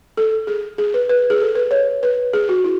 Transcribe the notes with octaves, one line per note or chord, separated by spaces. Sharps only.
A4
G#4
G#4
B4
B4
G#4
A4
B4
C#5
B4
G#4
F#4
E4